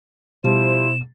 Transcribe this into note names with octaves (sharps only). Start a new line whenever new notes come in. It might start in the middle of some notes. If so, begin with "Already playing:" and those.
B2 F3 G3 E4 C5 E7